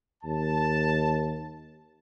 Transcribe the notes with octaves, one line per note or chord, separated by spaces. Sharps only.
D#2 A5